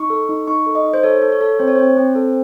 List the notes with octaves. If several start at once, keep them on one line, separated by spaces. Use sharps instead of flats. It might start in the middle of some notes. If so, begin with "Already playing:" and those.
Already playing: D#4 C#6
A4
D#4
D#4 C#6
A4
D#5
D#4
C5
A4 C#5
A4
C#5
A4
C4 C5
C#5
C4 C5
C4
A4